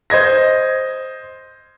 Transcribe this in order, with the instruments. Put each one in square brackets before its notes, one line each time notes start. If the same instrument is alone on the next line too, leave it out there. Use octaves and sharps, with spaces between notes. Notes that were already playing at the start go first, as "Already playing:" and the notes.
[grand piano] C5 D#5 G#6 A#6